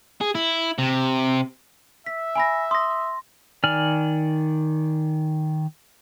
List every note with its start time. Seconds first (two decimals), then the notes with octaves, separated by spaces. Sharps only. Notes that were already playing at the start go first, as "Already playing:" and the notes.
0.21 G#4
0.35 E4
0.78 C3
2.06 E5 B6
2.35 G#5 B5 A#6
2.71 C6 D#6 A#6
3.64 D#3 D5 G#5 F6